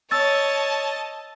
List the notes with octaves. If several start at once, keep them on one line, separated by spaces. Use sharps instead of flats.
C#5 D#5 A5 E6 A6